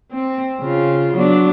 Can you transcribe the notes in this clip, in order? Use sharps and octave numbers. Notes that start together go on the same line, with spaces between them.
C4
C#3 F4
F#3 B3 D4